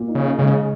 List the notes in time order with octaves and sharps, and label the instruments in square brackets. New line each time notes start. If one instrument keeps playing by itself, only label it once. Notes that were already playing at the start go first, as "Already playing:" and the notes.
Already playing: [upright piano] A#2
D#4
[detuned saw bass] C#3
[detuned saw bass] C#3 [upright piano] G#3